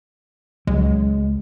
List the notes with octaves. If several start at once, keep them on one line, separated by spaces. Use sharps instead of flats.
C#2 F#3 G#3